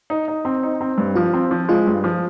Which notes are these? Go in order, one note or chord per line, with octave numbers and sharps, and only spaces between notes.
D#4
D#4
C4
D#4
C4
G2
F3 F4
C4
F3
G#3 F4
G2
F3